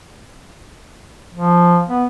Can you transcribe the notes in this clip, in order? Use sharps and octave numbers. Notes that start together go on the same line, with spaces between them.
F3
B3